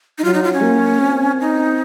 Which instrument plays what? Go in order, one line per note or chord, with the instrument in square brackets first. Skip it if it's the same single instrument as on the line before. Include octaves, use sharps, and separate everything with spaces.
[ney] D#4
[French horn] F#3 [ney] F4
[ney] D#4
F4
C#4
[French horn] A#3
C4
[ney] D#4